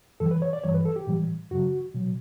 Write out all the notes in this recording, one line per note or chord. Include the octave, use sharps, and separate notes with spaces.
F#2 E3 G3 A4
B4
C#5
D5
G2 E3 G3 C#5
B4
A4
G4
A2 E3 G3
F#2 C#3 F#3 F#4
B2 F#3